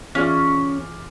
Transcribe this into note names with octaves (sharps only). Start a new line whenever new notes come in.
E3 C#4 F4 G#4 D5